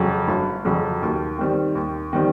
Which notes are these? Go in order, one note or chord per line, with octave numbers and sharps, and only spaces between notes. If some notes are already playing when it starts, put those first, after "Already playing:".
Already playing: F2 C#3 F#3
G1
F2 C#3 F#3
D#2
D#3 G3 C4
D#2
D#3 G3 C4